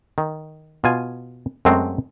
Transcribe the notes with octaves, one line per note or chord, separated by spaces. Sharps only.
D#3
B2 F4 G#5
F#2 G#3 A3 C4 F#4